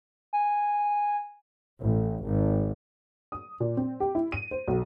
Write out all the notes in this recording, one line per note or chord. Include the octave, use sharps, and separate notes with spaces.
G#5
A1
G#1
D#6
A#2
C4
G4
E4
D#7
C5
B1